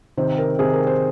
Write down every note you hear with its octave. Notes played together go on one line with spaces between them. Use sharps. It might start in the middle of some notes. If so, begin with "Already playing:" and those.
C3 D#3 C4 C5
A#4
C3 D#3 C4 G#4
A#4
C5